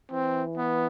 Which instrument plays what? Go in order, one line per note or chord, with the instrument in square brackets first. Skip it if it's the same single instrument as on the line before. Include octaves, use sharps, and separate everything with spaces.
[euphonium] E3 [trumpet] C4
[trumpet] B3